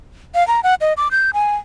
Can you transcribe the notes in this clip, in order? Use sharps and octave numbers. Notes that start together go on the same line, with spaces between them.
F5
A#5
F#5
D#5
D6
G6
G#5